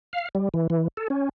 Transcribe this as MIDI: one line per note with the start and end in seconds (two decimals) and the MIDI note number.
0.13 0.29 77
0.35 0.49 55
0.54 0.67 52
0.70 0.88 52
0.97 1.08 69
1.10 1.29 61